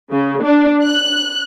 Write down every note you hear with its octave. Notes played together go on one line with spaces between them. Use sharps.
C#3
D4
F#6